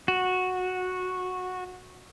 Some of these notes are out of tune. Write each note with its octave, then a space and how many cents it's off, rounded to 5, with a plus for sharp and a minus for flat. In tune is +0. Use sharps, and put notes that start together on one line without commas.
F#4 -10